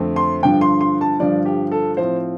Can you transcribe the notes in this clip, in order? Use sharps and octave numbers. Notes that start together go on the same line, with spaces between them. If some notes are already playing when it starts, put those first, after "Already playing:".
Already playing: F2 D3 A3 C4
C6
G2 D3 F3 G5
C6
C6
A5
G2 D3 F3 D5
G4
A4
A2 F3 C4 C5